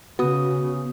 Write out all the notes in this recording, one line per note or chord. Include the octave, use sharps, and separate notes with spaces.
C#3 B3 F#4 D#6